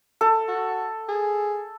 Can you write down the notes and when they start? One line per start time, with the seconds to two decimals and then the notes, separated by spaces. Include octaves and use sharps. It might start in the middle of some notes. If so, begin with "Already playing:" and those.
0.21 A4
0.48 F#4
1.08 G#4